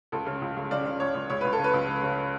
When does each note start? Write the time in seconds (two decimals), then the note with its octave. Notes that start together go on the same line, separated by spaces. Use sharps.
0.12 C#2 A4
0.26 C#3
0.42 C#2
0.57 C#3
0.71 C#3 D5
0.86 C#3
1.00 C#2 C#5
1.14 C#2
1.30 C#2 C#5
1.41 C#2 B4
1.53 A4
1.59 C#3
1.64 B4
1.73 C#2
1.88 C#3
2.03 C#3